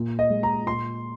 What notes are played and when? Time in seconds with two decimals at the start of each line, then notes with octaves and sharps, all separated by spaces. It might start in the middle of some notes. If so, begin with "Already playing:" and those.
Already playing: A#2
0.19 D#5
0.30 G#3
0.43 A#5
0.66 A#2 C6